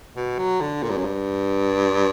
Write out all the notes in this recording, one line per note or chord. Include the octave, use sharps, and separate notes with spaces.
B2
F#3
D3
A#2
G2
F#2
G2